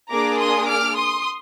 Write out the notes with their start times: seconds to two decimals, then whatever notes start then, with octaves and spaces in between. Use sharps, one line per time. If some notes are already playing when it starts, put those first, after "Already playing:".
0.11 A#3 D4 G#4 A#5 D6
0.39 C6 D#6
0.68 D6 F6
0.95 C6 D#6